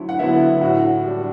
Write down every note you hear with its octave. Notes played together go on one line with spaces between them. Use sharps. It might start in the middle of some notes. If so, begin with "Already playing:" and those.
Already playing: D2 D3 F#3 E4
F#5
D3 F#3 B3 E4 E5
A2 F#4 F#5
G3 D4